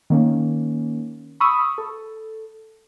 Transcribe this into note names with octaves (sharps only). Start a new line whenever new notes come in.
D#3 A#3 C#4
B5 C#6 D#6 E6
A4